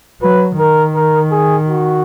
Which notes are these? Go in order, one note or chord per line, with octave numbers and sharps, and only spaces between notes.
F#3 B4
D#3 A#4
A#4
G#4
F#4